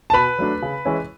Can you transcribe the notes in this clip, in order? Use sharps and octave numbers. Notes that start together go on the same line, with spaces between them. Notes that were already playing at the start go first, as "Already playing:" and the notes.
A5
B2 B4 B5
F#3 A3 D4
C#3
E3 G#3 C#4 E4